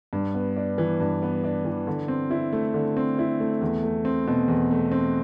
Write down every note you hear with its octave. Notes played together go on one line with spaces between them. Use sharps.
G2
B3
D4
E3
G2
B3
D4
E3
D3
C4
E4
A3
D3
C4
E4
A3
E2
A3
C4
B2
E2
A3
C4